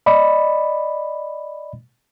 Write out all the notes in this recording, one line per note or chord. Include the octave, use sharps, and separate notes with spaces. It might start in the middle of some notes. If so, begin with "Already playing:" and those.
D5 D#5 B5